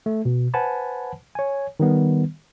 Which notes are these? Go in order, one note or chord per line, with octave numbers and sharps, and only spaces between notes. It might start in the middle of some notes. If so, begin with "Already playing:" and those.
A3
B2
B4 C5 F#5 G#5 A5 B5
C#5 G#5
D#3 G3 B3